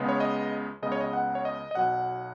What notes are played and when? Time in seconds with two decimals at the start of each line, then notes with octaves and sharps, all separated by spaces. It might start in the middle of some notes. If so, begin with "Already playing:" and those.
Already playing: C#2 C#3 G#3 B3
0.09 C#5
0.20 D#5
0.82 C#2 C#3 G#3 B3 D#5
0.92 C#5
1.01 D#5
1.13 F#5
1.35 C#5
1.45 D#5
1.71 D#5
1.75 B1 B2 F#3 F#5